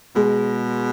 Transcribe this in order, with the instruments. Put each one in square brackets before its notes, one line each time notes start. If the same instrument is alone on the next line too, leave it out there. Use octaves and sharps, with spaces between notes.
[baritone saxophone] B2 [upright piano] G#3